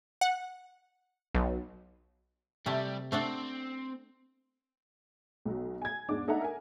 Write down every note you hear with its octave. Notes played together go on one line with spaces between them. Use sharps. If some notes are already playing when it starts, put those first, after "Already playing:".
F#5
B1
C3 G3 A3
A3 C4 D4 F#5
B1 F#3
G#5 G#6
E2 G#2 G#3 D4 D6
D4 D#4 A4 E5 F#5 A#5
A#4 G#5